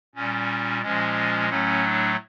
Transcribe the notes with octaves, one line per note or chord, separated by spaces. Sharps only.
A#2 G3 C#4
A#2 F3 G#3 C#4
A2 F#3 A3 C#4
D4